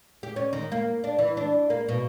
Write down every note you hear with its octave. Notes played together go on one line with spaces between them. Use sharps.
G4
C#4
D#3
A#3
D4
E3
D4
A#3
B2